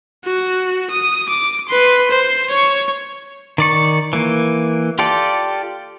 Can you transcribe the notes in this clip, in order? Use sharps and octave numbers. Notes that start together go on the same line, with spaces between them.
F#4
D#6
D6
B4 C6
C5
C#5 C#6
D#3 D5 C#6
E3 A#3
F4 G4 A4 D5